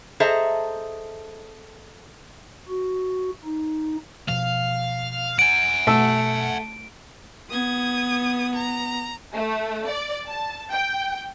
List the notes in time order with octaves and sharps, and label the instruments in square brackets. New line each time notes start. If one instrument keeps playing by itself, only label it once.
[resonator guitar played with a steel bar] G#4 A4 C5 D#5 E5 A#5
[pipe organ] F#4
D#4
[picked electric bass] B2 F3 [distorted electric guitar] F5
[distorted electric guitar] F#5 G#5 [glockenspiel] D7
[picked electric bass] B2 [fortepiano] A3 E6
[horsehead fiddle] B3 [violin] D#6 G#6
[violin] A#5
[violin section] A3
D5
A5
G5